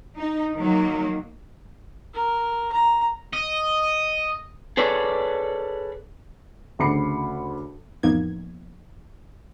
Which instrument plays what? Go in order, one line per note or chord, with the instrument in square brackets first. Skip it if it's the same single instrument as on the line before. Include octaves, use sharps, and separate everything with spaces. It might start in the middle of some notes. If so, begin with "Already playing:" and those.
[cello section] D#4
D#3 F#3 A#3
[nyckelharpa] A#4
A#5
[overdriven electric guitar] D#5
[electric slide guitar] G#4 A4 B4 C#5 D5
[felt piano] D2 C#3 B5 D6 C7 C#7
[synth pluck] A1 F2 A#3 B3 D#4 G#6